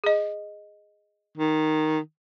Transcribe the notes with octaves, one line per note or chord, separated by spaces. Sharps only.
G#4 D#5
D#3